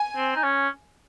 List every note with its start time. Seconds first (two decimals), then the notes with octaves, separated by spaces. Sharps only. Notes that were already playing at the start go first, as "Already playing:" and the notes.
Already playing: G#5
0.16 C4
0.35 D#4
0.44 C#4